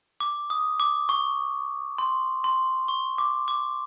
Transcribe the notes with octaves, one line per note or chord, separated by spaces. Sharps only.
D6
D#6
D6
C#6
C6
C6
C#6
D6
D6